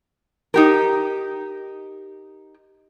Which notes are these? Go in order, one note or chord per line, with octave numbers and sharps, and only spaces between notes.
D#4 G4 A#4